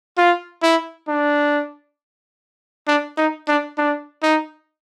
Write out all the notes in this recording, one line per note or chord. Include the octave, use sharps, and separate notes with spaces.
F4
E4
D4
D4
D#4
D4
D4
D#4